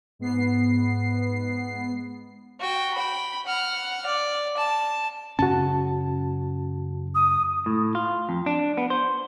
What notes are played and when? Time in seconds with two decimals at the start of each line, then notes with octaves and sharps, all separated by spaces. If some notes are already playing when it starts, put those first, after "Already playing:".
0.19 G#2 B3 C7
2.60 F#4 G5
2.94 G5 B5
3.46 F#5 F6
4.06 D5
4.57 A5
5.39 F#2 C#3 C#4 F#4 A5
7.15 D#6
7.66 A2
7.95 F4
8.29 F2
8.46 D4
8.77 B3
8.90 C5